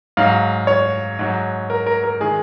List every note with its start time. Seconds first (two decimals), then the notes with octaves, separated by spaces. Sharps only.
0.17 G#2 F#3 F5
0.67 C#5
1.19 G#2 F#3
1.70 A#4
1.86 A#4
2.04 A#4
2.20 D#3 G#3 G#4